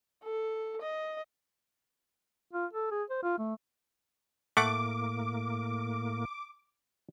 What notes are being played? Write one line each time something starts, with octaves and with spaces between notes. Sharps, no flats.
A4
D#5
F4
A4
G#4
C5
F4
A3
A2 A3 A#3 F#5 D6